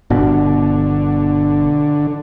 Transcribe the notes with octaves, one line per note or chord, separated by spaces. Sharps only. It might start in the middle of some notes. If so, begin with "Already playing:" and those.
G1 B2 D3